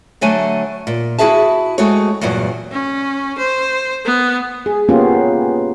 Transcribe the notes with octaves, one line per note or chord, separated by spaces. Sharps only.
D3 F#3 A3 G#5
A#2
E4 F#4 G#4 E5 A5
G#3 A3 C4 F#4 C#5
E2 G2 A#2 F#3
C#4
C5
B3
G#4
A#3 B3 C#4 F4 G4